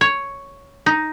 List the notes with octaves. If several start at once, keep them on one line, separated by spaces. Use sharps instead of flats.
C#5
D#4